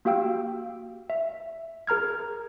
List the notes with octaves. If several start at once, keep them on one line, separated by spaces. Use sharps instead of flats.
A#3 F#4 G4 F5 G5 E6
E5
G#4 A#4 A#5 F6 G#6